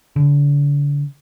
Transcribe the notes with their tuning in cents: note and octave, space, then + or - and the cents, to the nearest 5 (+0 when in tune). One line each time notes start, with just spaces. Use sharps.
D3 -35